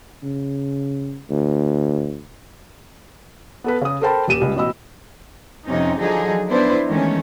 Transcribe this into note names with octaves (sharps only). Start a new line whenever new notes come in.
C#3
D2
B3 A4 B4
C#3 D#6
A4 A#4 C5 G5 A5 B5
D#1 G4 D#7 E7
C#2 G3
A1 B2 D#5 B5 E6
F2 C3 C#4 D#4
D3 F3 F#3 D#4 G#4
B3 D4 E4 B4 C5
D#3 E3 G#3 A3 C#4